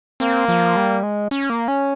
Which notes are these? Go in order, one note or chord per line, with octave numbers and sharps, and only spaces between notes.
A#3 C4
F3
G3
G#3
C#4
A#3
C#4